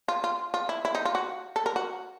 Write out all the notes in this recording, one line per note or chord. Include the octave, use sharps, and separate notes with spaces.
F4
F4
F4
E4
E4
D#4
F4
F#4
A4
A#4
F#4